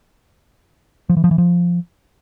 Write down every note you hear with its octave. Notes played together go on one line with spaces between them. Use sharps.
F3
E3
F3
E3
F3